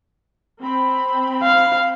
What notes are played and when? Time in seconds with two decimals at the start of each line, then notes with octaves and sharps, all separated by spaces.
0.62 C4 B5
1.43 F5